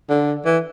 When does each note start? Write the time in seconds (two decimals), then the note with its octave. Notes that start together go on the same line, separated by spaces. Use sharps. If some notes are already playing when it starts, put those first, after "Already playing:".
0.09 D3
0.45 E3